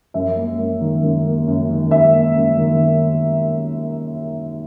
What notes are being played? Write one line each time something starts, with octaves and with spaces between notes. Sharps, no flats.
F#2 E5
A#3
F#2
D#3
F#2
A#3
F#2
D#3
F#2 E5
A#3
F#2
D#3